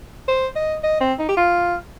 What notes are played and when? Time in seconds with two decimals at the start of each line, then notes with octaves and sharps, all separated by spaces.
0.28 C5
0.56 D#5
0.83 D#5
1.00 C4
1.19 D#4
1.29 G4
1.37 F4